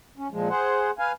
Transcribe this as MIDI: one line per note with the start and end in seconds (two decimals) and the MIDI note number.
0.18 0.28 61
0.31 0.49 46
0.31 0.49 53
0.31 0.49 56
0.49 0.91 68
0.49 0.91 72
0.49 0.91 78
0.99 1.12 71
0.99 1.12 77
0.99 1.12 80